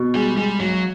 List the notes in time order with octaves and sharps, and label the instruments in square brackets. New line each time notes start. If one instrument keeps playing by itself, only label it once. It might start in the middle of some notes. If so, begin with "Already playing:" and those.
Already playing: [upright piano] B2
[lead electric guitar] G3 [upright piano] G#3
[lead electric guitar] G3 [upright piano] G#3
[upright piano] B1 [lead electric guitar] F#3